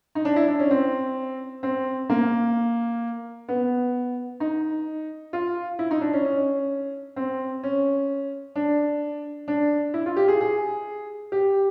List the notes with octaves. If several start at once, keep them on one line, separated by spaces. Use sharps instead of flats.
D#4
D4
E4
D4
C#4
C4
C4
A#3
B3
D#4
F4
E4
D#4
D4
C#4
C#4
C4
C#4
D4
D4
E4
F4
G4
G#4
G#4
G4